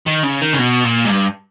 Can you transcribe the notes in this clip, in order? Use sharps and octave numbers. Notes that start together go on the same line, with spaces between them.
D#3
C#3
D#3
C#3
B2
A#2
G#2
G2